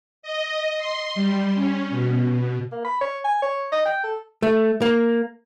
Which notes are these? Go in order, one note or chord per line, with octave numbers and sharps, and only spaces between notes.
D#5
C6
G3
C#4
B2
B2
A#3
B5
C#5
G#5
C#5
D#5
G5
A4
A3
A#3